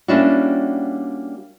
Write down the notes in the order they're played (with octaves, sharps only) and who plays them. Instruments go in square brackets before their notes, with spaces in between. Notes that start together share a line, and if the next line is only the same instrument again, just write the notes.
[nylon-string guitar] G3 A#3 C#4 D4 E4 F#4